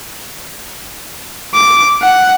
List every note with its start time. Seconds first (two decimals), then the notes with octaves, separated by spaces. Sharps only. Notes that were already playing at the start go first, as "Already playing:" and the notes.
1.54 D6
2.02 F#5